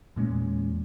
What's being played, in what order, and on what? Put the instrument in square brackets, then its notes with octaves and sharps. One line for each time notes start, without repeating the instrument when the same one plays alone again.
[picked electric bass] E2 A#2 G#3 C#4